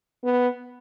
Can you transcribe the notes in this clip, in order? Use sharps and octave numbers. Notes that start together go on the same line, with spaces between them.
B3